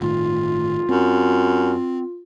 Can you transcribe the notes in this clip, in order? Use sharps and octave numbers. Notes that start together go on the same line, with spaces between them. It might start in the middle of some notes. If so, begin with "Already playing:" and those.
G1 A2 D#3 F4
F#2 C4